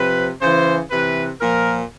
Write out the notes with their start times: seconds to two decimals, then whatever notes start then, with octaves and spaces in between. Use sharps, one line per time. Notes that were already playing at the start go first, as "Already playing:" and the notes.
Already playing: C3 F3 B4
0.41 C#3 E3 C5
0.91 C3 E3 B4
1.41 A#2 F3 A#4